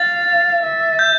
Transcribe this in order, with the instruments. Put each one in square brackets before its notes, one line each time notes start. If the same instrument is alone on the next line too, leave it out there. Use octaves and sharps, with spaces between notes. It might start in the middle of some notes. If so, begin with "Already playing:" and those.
Already playing: [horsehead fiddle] F5 [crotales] A6
[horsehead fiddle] E5
[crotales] G6